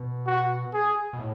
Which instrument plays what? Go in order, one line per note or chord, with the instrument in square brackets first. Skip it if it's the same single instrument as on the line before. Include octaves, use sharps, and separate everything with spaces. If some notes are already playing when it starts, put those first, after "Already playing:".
Already playing: [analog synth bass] B2
[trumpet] F#4
G#4
[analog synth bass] B2
A2